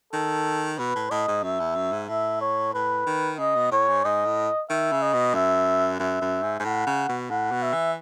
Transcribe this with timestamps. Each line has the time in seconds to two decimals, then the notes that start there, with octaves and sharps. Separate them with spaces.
0.13 D#3 A4
0.78 B2 B4
0.95 A2
1.11 A2 D#5
1.28 G#2
1.43 F#2 E5
1.60 E2
1.76 F#2
1.92 G#2
2.09 A2 E5
2.41 C#5
2.74 A2 B4
3.06 D#3
3.39 C#3 D#5
3.55 B2
3.71 A2 C#5
3.88 G#2
4.05 G#2 D#5
4.26 A2
4.70 D#3 E5
4.92 C#3
5.02 D#5
5.13 B2
5.34 F#2 E5
5.99 F#2 E5
6.21 F#2
6.43 G#2
6.60 G#2
6.65 A2 F#5
6.87 C#3
7.09 B2
7.30 A2 F#5
7.51 B2
7.62 E5
7.73 E3